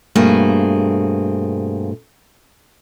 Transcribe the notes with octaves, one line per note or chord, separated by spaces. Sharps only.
G2 B2 A3 A#3 C4 G#4